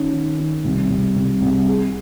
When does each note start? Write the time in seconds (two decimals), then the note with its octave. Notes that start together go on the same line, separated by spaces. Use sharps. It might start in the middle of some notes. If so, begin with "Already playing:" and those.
Already playing: D#3 C#4
0.13 D#3
0.39 D#3
0.64 C2
0.90 C2
1.16 C2
1.42 C2
1.68 G#4